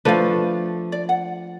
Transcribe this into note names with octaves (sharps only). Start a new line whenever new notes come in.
F3 A3 D4 B4 F5
D5
F#5